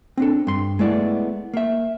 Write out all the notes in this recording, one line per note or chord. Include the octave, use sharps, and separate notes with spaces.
C4 D4 A4
G2 C6
G#3 A3 B3 E4 D5
A#3 E5